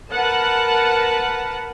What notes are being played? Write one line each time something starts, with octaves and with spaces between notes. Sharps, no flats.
A#4 B4 F#5 A5